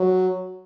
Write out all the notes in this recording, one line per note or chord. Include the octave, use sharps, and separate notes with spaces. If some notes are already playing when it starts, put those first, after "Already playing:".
Already playing: F#3